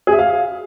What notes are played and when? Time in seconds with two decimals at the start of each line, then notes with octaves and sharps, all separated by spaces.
0.07 G#4
0.13 E5
0.19 F5